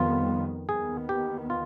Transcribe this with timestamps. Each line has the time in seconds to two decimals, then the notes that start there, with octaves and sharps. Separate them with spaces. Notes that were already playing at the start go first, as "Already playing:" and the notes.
Already playing: F2 D#3 G3 B3 F4
0.69 D#2 D#3 B3 G#4
1.09 G4
1.50 F4